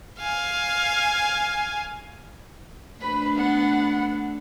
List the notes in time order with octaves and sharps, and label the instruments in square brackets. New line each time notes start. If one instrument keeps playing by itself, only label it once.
[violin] F5 G#5
[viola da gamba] A3 D4 [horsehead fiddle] B4 B5
[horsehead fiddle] B3 F#5